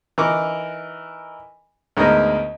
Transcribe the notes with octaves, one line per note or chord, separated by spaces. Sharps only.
E3 D#4 A#4 C#6 D6
D2 G#2 B3 A#4 D#5